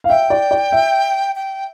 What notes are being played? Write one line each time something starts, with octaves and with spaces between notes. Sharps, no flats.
F5
E5 G5
D5
D5
E5
G5